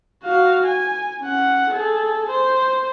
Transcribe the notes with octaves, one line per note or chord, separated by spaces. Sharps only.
F#4 F5
G#5
C#4 F#5
G#4 A4
C5